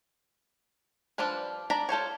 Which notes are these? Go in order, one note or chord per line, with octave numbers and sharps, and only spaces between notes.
F3 G3 D4 F4 B4
D4 D5 A#5 B5
F4 A4 C5 C#5